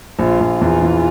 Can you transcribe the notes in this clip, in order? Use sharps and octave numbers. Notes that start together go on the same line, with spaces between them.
A#1 F4
A#1
E2 F4
E3